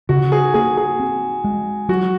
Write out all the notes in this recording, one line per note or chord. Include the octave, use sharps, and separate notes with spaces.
C#3 F#4
G#4
A#3 G#4
G#4
C4
G#3
F#3 F#4